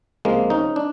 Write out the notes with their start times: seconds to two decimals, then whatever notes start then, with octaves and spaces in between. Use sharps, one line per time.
0.25 C#2 C3 F3 G#3 A#3
0.50 C#4 D#4
0.76 D4